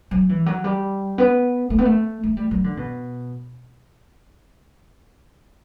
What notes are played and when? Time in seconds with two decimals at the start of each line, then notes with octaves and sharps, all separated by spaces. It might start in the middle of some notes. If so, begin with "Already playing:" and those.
0.11 F#3
0.29 E3
0.46 F#3
0.64 G3
1.18 B3
1.70 A3
1.79 B3
1.85 A3
2.23 A3
2.37 G3
2.51 F#3
2.64 D3
2.77 B2